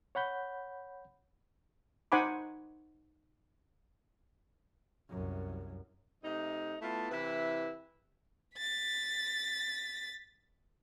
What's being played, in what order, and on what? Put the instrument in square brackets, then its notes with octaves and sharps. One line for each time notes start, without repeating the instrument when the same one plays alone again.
[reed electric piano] C#5 F#5 B5 G6
[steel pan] D#4 C5 F#5 G#5 B5 D6
[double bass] C2 F#2
[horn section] C3 A3 D#4
A3 B3 E4 F4 A5
C3 E3 E4 B4 E5
[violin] A6 B6